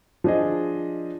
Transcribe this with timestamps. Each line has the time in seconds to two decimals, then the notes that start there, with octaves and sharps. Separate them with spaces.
0.24 F3 D4 G#4 D#5